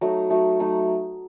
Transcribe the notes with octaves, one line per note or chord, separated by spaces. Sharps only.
F#3 A3 D#4
F#3 A3 D#4
F#3 A3 D#4